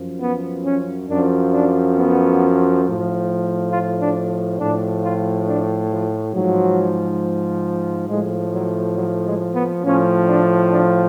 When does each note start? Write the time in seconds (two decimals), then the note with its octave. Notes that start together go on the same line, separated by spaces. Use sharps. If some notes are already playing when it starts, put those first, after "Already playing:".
Already playing: F#2 F3
0.21 B3
0.66 C#4
1.10 F#2 F3 D4
1.53 D4
1.97 B3
2.84 A2 F3
3.72 F4
4.01 D4
4.60 A2 F3 D4
5.04 F4
5.47 D4
5.91 F3
6.34 G#2 F3 F#3
8.09 A2 F3 G#3
8.53 F#3
8.97 F#3
9.27 G#3
9.55 B3
9.85 A2 F3 C#4
10.28 D4
10.72 D4